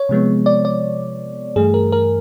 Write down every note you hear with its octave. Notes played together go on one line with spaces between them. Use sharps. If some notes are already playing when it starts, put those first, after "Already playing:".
Already playing: C#5
C3 F3 G#3 B3
D5
D5
G2 E3 A3 G#4
A#4
A#4